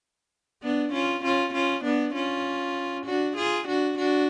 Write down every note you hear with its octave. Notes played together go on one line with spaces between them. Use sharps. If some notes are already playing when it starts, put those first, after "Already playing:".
B3 D4
C#4 F4
C#4 F4
C#4 F4
B3 D4
C#4 F4
D4 F#4
F4 G#4
D4 F#4
D4 F#4